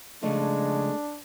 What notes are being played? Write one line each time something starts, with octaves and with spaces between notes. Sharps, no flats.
C#3 F3 G#3 A3 D4 D#5